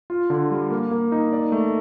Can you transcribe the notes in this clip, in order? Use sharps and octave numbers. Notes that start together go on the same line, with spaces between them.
F4
D3
G3
A#3
A#3
D#4
D5
A3